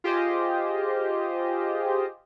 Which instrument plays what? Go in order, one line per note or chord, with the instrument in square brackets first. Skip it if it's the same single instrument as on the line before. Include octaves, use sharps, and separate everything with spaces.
[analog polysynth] F4 G4 G#4 C5 D#5